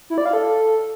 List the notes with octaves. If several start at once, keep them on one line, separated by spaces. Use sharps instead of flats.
E4
D5
F5
A4